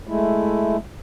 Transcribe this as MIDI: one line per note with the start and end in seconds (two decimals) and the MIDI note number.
0.07 0.77 56
0.07 0.77 57
0.07 0.77 64